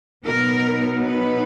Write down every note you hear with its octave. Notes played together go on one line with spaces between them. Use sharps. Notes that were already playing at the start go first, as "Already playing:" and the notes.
B2 F#3 B3 D#4 A#4
B4